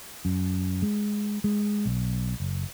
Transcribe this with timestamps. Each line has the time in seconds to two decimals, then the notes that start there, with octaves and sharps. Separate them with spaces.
0.25 F#2
0.82 G#3
1.44 G#3
1.85 B1
2.40 F#1